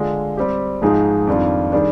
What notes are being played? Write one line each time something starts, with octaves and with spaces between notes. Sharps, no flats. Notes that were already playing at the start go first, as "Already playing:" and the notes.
Already playing: D3 G#3 D4 F4
G3 C4 G4
G#2 F3 G#3 D#4 G#4
F2 D#3 G3 D4 F4
D#3 G3 D4 G#4